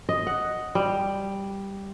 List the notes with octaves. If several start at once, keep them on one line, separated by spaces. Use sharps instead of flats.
D#5
F#5
G3